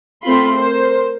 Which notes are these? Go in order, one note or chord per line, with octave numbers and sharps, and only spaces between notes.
A3 C4 F4 B5 C6
A#4 C5